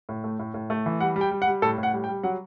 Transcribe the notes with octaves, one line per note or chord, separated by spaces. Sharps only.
A2
A3
A2
A2
A3
E3
G3 F#5
G3
G5
G3
F#5
G3
A2 A4
A2
F#5
G3
G5
G3
F#3 F#5